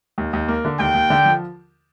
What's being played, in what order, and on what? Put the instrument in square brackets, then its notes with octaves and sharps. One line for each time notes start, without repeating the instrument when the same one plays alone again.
[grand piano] D#2
D#2
A#3
D3
[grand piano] D#2 [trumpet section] G5
[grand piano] D#2
D3
F3